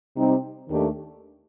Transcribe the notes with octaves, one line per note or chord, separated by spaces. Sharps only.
C3 G3 C4 D#4 G4
D#2 D#3 A3 D4 G4